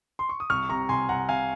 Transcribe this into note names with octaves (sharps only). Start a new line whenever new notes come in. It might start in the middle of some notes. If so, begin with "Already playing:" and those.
C6
C#6
D#6
C2 C#6 F6
C3 A#5 C#6
C2 G#5 C6
C2 F#5 A#5
C3 F5 G#5